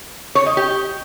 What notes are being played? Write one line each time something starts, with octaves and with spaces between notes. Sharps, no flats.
C#5
D#5
G4